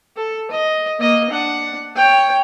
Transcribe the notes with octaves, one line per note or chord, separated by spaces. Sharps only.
A4
D#5
A#3 D#5
D4 F#5
C#5 G5